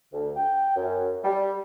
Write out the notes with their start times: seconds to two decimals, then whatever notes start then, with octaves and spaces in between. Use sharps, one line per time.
0.13 D2
0.36 G5
0.76 F#2
1.24 G3